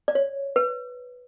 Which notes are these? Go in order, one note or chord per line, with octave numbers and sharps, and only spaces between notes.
D5
C#5
B4